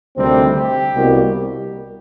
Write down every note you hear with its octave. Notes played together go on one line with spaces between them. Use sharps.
D2 C3 D#3 G3 C4
G4
C2 B2 G3 A#3